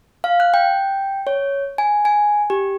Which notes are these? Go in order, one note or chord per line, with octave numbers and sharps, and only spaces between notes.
F5
F#6
G5
C#5
G#5
G#5
G4